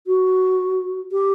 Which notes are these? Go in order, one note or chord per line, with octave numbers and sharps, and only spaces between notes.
F#4
G4